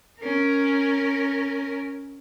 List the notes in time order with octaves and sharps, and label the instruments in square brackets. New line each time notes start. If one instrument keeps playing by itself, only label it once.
[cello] C#4 A#4